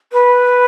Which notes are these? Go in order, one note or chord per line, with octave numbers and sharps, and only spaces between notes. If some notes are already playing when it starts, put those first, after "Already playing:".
B4